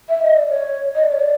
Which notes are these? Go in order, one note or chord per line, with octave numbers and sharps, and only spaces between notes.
E5
D#5
D5
C#5
D#5
D5
C#5
D5